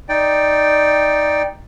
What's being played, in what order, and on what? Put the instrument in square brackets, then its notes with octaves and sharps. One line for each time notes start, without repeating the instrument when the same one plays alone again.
[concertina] D#4 D5 G5